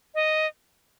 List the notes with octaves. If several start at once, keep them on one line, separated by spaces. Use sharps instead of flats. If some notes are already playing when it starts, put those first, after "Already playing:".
D#5